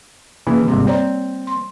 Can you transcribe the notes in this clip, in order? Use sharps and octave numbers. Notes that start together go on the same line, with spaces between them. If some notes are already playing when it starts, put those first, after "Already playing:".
C#3 E3 A#3 E4
G#1 C3 G3
C4 C#5 D5 A#5
C6